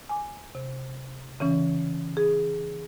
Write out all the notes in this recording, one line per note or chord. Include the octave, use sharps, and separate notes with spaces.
G#5 D6
C3
C#3 E3 C#4
G#4